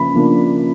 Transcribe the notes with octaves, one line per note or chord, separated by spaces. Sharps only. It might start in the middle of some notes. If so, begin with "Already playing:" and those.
Already playing: C#3 F3 A#3 B5
C#3 F3 A#3 D4